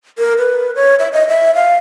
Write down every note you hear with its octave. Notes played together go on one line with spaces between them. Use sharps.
A#4
B4
C#5
E5
D#5
E5
F5